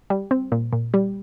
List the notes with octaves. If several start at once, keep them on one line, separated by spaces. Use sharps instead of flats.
G3
C4
A#2
A#2
G3